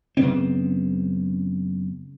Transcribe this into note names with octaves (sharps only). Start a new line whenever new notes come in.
F#2 C#3 B3 C4